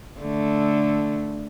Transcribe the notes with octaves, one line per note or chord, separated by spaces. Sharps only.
D3 A3